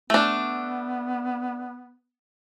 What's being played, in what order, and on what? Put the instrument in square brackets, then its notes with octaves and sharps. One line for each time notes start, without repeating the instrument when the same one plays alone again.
[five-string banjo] A3 D4 [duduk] B3